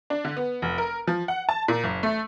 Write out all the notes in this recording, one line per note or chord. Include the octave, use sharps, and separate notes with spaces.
D4
D3
B3
F1
A#4
F3
F#5
A5
A#2
F#1
A3